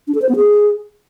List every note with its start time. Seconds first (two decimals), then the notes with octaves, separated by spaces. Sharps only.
0.08 D4
0.15 A4
0.22 C5
0.29 B3
0.36 G#4